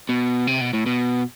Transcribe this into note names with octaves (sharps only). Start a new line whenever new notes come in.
B2
C3
B2
A2
B2